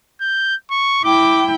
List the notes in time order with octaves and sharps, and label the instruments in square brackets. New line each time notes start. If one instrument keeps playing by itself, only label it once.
[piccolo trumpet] G6
C#6
[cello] E4 G5 [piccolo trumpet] D6